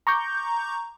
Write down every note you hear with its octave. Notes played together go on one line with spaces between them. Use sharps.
A#5 C#6 D6 G6